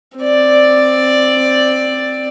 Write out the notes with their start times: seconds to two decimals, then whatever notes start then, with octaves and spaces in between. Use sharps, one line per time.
0.18 C4 D5